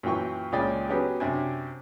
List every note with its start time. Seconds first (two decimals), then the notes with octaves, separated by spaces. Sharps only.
0.03 F#2 A#2 E3 G5 C#6
0.52 C#2 A#2 C#4 G#4 D5 G5
0.89 F#3 B3 C#4 G4 G#4
1.20 F#2 C3 D4 G#5